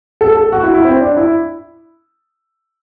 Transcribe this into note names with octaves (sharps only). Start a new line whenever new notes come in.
A4
A4
F#4
E4
E4
C4
D4
E4